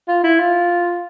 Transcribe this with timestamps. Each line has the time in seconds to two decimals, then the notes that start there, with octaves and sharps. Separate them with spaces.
0.08 F4
0.24 E4
0.39 F4